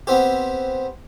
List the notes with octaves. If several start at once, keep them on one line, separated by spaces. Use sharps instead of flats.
B3 C4 G4